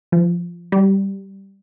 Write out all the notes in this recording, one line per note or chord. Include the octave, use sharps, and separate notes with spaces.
F3
G3